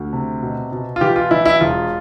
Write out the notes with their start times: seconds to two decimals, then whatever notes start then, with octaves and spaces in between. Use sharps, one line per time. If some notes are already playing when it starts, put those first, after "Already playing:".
Already playing: D2
0.13 C3
0.42 B2
0.72 B2
0.96 F4
1.01 E3 G4
1.16 F4
1.31 E3 E4
1.45 E4
1.60 E1 F4